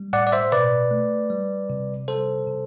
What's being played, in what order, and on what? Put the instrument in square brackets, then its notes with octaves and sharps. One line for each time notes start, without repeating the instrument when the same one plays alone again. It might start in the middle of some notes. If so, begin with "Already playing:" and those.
Already playing: [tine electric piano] G3
A2 D5 F#5
D5
C5 E5
B2 B4 D5
A3
G3
C3
G3 A4 C5
C3